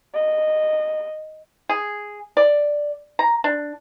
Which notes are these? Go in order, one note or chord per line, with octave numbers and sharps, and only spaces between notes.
D#5
G#4
D5
A#5
D4